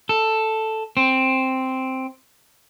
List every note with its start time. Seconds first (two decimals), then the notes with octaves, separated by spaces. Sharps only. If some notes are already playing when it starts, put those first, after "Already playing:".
0.09 A4
0.97 C4